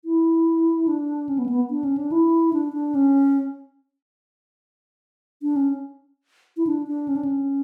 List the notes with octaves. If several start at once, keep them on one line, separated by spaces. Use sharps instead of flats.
E4
D4
C#4
B3
A3
B3
D4
C#4
D4
E4
D4
D4
C#4
D4
C#4
E4
D4
D4
C#4
D4
C#4